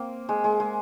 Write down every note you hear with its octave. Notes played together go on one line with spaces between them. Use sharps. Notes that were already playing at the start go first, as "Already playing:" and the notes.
Already playing: A#3 C4
G#3
G#3
G#3